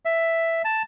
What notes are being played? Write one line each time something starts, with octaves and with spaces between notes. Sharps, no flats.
E5
A5